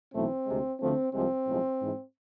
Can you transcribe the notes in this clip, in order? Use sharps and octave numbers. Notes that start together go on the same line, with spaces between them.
B1 A2 E3 A3 C4
D2 C3 G#3
D2 D3 F3 A3 C4
C2 C3 F3 G#3 C4
B1 A2 F3 G#3
G#2 E3 G#3